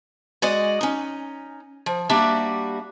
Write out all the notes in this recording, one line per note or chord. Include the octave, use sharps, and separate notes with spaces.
G#3 F#4 D5 D#5
C#4 D#4
F3
G3 A#3 D4 F#4 G4 E5